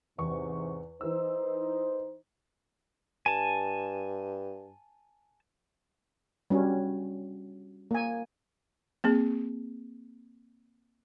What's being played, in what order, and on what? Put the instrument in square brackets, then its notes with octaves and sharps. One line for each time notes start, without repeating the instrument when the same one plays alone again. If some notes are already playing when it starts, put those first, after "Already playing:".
[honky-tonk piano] E2 C#6 [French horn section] G#2 C3
[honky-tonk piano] E3 E6 [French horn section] D#4 C5
[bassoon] G2 [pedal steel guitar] G#5 A5
[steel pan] G3 C#4 F#4
A#3 G#5
[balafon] A#3 C4 G#4